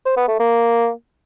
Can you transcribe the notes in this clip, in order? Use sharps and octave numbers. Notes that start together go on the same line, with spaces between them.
C5
B3
A3
A#3